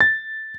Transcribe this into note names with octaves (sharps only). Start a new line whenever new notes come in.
A6